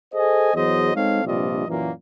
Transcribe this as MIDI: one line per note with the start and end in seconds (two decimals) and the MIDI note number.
0.14 0.52 68
0.14 0.52 69
0.14 0.52 72
0.14 0.52 75
0.14 0.52 80
0.55 0.94 40
0.55 0.94 54
0.55 0.94 68
0.55 0.94 72
0.55 0.94 75
0.95 1.22 56
0.95 1.22 60
0.95 1.22 63
0.95 1.22 69
0.95 1.22 73
0.95 1.22 77
1.25 1.67 34
1.25 1.67 43
1.25 1.67 48
1.25 1.67 65
1.25 1.67 74
1.25 1.67 75
1.67 1.90 42
1.67 1.90 46
1.67 1.90 52
1.67 1.90 54
1.67 1.90 58